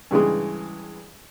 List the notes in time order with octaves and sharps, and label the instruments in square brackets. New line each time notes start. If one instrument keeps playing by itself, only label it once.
[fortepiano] G2 C#3 E3 G#3